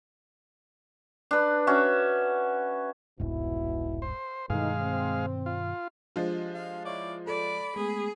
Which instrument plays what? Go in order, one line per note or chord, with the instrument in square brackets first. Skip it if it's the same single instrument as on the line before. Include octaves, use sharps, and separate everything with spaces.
[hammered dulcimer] D4 B4
C#4 F#4 E5
[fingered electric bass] E1 C2 G#2 [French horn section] B2 E4
[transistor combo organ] C5
[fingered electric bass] G2 B2 D#3 [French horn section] E3 A3 D#4 [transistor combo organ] G#3 F5
[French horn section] C4
[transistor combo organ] F4
[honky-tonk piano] F3 G#3 F4 [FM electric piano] D4 G4
[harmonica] F5
[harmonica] E4 D5 [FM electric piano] C#5 F5 C#6
[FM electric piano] A4 [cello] D5 [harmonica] B5
[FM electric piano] G#3 A3 B3 [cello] G#4